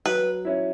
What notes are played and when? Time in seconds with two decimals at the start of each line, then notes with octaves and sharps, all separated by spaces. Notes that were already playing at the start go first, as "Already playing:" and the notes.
0.06 F#3 B4
0.45 C#4 E4